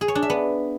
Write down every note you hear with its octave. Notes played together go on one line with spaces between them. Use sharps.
G#4
C#5
D4
E5
B3